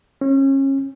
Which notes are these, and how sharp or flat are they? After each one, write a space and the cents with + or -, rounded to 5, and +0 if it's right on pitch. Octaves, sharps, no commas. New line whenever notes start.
C#4 -30